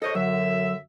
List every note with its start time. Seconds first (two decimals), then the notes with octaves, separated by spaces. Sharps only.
0.02 A4 C5 C#5 D#5
0.15 F#2 D3 F#3 E5